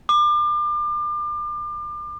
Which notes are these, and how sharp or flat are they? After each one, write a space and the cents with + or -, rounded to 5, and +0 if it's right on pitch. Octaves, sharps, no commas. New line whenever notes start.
D6 +35